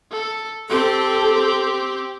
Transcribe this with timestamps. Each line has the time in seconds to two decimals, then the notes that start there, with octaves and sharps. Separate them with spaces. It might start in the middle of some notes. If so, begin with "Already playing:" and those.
0.11 A4
0.70 C4 G4 A4